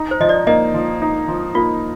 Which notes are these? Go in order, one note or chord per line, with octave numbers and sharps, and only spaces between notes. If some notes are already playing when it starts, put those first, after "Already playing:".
Already playing: D#4
C5
F3 D#5
D5
A#3 D#5
F3
D#4
F3
A#3 F4